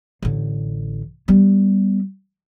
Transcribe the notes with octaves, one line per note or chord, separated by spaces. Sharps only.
A1 D3
G3 B3